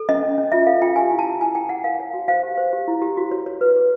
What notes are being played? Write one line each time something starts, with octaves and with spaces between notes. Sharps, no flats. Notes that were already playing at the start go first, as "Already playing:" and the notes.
Already playing: A4
C#4 D#5
C#4
C#4
F4 E5
A4 F5
F4 G5
G4 G#5
E4
A5
G4
E4 G#5
E4 G5
G#4 F#5
A#4 F5
C#5
F#4
C5 F5
G4
C5
G4
E4
G4
F#4
C#5
C#5
B4
G#4